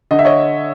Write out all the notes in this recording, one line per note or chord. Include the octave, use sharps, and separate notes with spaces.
D3 D#5
E5
C#5 D#5